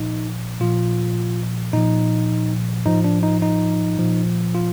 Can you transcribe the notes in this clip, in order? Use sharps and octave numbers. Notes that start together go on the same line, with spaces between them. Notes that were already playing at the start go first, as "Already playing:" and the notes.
Already playing: A#2 F3 D#4
A#2 F3 F4
A#2 F3 D#4
A2 F3 D#4
D4
D#4
D#4
A#2 F3
F4